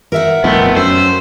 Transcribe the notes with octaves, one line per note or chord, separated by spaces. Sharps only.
A#4 E5 F#5
D#1 F2 D#3 A3 B3 C4
F#2 C5 E6